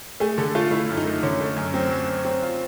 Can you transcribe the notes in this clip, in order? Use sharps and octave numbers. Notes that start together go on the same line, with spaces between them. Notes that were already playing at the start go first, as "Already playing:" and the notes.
A3 G#4
D3 A4
A3 F4
A3 E4
F#2
D#4
A3
D3 C#4
A3
F#2
F#3 C4
F#3
F#3
F#3 C4
F4